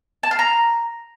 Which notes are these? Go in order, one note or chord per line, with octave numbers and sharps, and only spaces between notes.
A5
F5
A#5